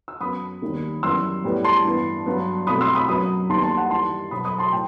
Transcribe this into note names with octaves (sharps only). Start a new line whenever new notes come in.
E6
F#2 F#3 B3 B5 D#6
D#2 D#3 G3
F#2 E3 G3 B3 C6 E6
A2 G3 B3
A5 C6
G2 E3 B3
G2 F#3 B3
C2 B2 A3 B5 D#6
C6 E6
B5 D#6
F#2 F#3 B3 B5 D#6
D#2 D#3 G3 B3 A5 C6
A5 C6
F#5 A5
G2 E3 G3 A5 C6
B2 F#3 B3 B5 D#6
B5 D#6
A5 C6
A2 G5